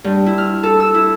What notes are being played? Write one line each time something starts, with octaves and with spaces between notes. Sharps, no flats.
G2
E4
F6
A4
E6
E4